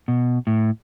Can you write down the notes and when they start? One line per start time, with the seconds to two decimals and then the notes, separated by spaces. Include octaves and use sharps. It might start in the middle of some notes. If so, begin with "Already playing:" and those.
0.08 B2
0.47 A2